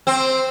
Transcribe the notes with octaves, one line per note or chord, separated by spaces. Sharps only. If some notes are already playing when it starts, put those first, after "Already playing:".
C4